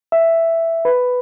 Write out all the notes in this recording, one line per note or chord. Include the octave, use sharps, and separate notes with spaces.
E5
B4